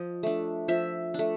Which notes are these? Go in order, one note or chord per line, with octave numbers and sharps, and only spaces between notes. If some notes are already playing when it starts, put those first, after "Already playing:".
Already playing: F3 D#5
A3 D4
F3 E5
A3 D4